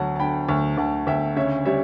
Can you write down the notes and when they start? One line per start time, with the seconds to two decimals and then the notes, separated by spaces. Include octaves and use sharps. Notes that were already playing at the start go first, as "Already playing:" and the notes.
Already playing: D2 F#3 F#5 A5
0.16 A5
0.19 D3 G5 B5
0.49 D2 A5 C#6
0.78 D2 F#5 A5
1.07 D2 E5 G5
1.36 C#3 C#5 E5
1.65 G3 C#5 E5